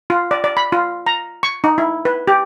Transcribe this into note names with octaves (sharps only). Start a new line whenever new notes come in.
F4
D5
D5
B5
F4
A#5
C#6
D#4
E4
B4
G4